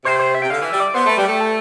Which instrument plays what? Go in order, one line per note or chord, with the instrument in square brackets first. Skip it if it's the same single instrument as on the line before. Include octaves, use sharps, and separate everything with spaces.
[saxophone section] C3 [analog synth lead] C5
[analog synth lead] C5
E5
[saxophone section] C3 [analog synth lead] G5
[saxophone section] D3 [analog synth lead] F5
[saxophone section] E3 [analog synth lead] E5
[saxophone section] G3
[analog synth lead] D5
[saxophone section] B3 [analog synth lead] C5
[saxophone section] A3 [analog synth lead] B4
[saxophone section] G3
[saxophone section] A3 [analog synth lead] G4
[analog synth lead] A4